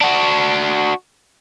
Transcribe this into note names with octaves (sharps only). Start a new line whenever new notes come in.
D4 F#4